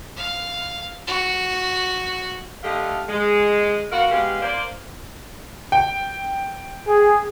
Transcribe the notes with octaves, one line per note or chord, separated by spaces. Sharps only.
F5
F#4
D3 A3 G4 A4 D#5 F5
G#3
B3 F#4 A#4 F5
G#3 B3 G4 F5
A#3 C5 D5
G5
G#4